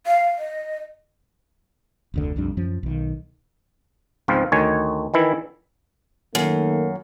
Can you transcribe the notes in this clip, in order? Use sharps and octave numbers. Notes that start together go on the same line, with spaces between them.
F5
D#5
F1 D2 D3
B1 F2 G3 D4
F#2 F3 C#4
B1 D#3
C#2 G#2 F3 C4 F4
D2 D#3 C#5 G#5
D#3 E3 E4
F#2 D#3 A3 A#3